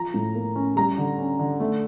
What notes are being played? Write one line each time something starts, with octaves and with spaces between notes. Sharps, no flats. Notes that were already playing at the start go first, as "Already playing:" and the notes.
Already playing: F3 A#5
A2
A#3
C#4
G3 A#5
D3
C#4
D3
A3